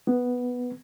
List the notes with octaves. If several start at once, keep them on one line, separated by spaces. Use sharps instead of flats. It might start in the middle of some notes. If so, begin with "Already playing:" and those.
B3